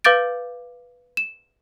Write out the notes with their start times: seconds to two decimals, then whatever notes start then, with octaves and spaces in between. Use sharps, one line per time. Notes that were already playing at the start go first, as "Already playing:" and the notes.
0.04 B4 F5 D6 G6 A6 D7
1.17 E7